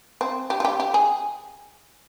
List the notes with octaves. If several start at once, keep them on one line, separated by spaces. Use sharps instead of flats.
C4
G4
F4
G4
G4
G#4